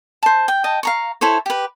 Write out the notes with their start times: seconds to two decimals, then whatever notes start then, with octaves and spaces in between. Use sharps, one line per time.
0.23 C5 A5
0.48 G5
0.64 D#5 G5 A5
0.83 F5 A#5 C#6
1.21 E4 A4 C5 C#5
1.46 G4 B4